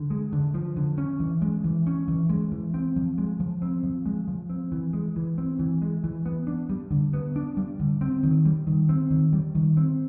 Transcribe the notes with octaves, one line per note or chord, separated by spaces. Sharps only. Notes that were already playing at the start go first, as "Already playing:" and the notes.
Already playing: D3
G#3
D3
F3
D3
C#4
E3
G#3
E3
C#4
E3
G#3
E3
C4
F3
G#3
F3
C4
F3
G#3
F3
C4
E3
G#3
E3
C4
E3
G#3
E3
B3
D4
G3
D3
B3
D4
G3
D3
C4
D#3
G3
D#3
C4
D#3
G3
D#3
C4